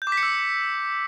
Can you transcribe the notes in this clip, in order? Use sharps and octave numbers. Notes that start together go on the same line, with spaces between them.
G6
D6
B6
C#7
E6